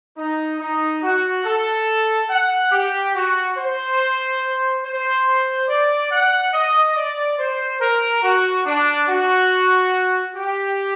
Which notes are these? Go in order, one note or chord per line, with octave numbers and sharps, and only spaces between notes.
D#4
D#4
F#4
A4
F#5
G4
F#4
C5
C5
D5
F#5
D#5
D5
C5
A#4
F#4
D4
F#4
G4